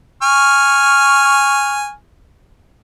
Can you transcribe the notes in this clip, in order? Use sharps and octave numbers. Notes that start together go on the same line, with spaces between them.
G#5 C#6 F6